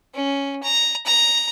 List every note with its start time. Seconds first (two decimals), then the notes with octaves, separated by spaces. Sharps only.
0.14 C#4
0.63 A#5
1.06 A#5